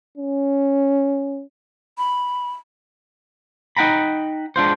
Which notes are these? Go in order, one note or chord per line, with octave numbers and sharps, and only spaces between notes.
C#4
B5
D#4 F#5 G5 A#5 B5
G#3 D4 F4 C5